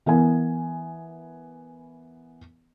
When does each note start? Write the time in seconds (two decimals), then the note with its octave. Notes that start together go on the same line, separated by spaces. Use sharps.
0.06 E3 B3 A#4 G#5